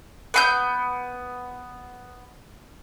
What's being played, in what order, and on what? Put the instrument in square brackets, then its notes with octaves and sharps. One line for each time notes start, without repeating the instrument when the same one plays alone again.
[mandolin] B3 C6 G6